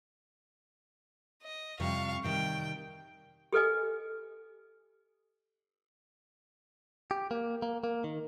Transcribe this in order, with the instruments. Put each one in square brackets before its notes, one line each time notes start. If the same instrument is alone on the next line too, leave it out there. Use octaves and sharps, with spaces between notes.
[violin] D#5
[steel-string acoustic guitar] F2 C3 G3 [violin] F5 C#6
[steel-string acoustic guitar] C3 D#3 G3 [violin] G5
[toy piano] G4 A4 B4 D#5 G#5
[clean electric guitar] G4
A#3
A#3
A#3
D#3